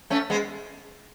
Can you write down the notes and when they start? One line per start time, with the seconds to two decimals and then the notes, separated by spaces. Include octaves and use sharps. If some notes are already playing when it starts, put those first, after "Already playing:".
0.10 A3 C#4
0.30 G#3 B3